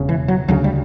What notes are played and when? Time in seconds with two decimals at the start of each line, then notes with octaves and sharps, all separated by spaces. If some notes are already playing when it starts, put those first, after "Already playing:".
Already playing: E1 C#3
0.09 E3
0.28 F#3
0.48 D2 C#3 F#3
0.64 G3